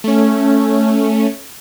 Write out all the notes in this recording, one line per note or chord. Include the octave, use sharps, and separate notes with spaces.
A3 C#4